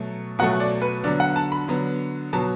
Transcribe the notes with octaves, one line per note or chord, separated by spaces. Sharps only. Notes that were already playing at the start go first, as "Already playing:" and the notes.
Already playing: B2 F#3 A3
B2 F#3 A3 F#5
D5
B4
D3 F#3 B3 D5
F#5
A5
B5
D3 F#3 B3
B2 F#3 B3 A5